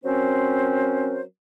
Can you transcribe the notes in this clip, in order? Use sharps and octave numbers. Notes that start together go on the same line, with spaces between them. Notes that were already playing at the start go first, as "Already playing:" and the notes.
F#3 C4 C#4 A#4 C5